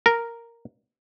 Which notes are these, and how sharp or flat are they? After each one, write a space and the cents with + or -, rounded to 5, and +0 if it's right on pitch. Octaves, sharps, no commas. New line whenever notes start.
A#4 -5